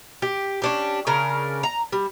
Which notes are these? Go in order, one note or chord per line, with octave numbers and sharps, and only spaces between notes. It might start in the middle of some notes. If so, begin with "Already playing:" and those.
G4
C#4 D4 G4
C#3 D4 A#4
A#5
G3